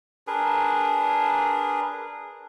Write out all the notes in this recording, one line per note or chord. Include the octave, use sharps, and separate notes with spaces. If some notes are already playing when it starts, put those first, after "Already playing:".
D4 G#4 A#4 B4